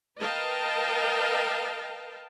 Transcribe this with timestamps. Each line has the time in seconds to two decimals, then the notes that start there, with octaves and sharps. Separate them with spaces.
0.18 A#4 B4 D#5 F5 G5 A5